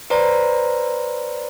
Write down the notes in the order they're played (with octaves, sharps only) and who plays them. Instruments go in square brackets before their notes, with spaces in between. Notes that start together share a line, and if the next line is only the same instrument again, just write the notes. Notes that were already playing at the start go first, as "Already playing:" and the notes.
[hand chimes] B4 C5 D5 A#5